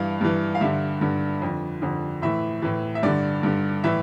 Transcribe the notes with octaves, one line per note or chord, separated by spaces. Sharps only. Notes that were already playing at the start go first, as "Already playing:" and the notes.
Already playing: G2 E3 F5
G2 E3
F5
G2 D3 E5
G2 D3
F2 D3
F2 D3
A2 E3 E5
A2 E3
E5
G2 D3 D5
G2 D3
A2 E3 E5